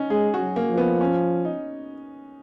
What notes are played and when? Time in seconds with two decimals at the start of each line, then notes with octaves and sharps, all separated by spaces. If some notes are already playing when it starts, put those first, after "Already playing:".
Already playing: C#4 D#4
0.10 G#3 G#4
0.34 F#4
0.40 F#3
0.56 A#3
0.70 F3
0.78 B3
1.01 C#4
1.45 D#4